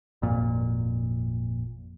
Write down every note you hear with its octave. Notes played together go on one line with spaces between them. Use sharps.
G#1 F2 A#2